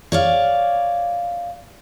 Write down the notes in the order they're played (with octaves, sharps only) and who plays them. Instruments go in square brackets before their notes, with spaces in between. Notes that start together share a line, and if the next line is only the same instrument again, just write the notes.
[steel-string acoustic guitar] C#5 D5 F5